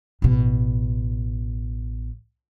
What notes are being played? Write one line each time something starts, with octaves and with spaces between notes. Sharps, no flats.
A1 B2